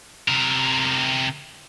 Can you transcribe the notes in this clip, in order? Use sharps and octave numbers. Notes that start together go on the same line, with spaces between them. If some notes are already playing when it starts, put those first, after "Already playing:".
C3 A#4